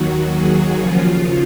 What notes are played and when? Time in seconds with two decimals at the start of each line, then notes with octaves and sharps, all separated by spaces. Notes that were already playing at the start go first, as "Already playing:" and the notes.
Already playing: D#2 D#3 F#3 F#4
0.34 G#4
0.79 D#2 C#3 F3 F4